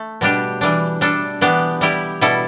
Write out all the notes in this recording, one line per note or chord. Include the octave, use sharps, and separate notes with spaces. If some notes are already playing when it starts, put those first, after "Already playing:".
Already playing: A3
B2 G3 D4 G4
E3 G3 D4
G3 D4 A4
E3 B3 D4 G4
G3 E4 G4
B2 G3 E4 A4